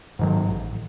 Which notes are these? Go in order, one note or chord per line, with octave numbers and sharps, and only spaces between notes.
G#2 D#3 F#3
A1